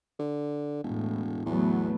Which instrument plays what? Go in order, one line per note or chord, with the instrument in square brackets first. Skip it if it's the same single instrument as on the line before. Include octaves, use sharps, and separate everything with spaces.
[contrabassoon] D3
[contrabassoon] E1 [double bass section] A2
[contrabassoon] E2 [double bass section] F#3 A3 B3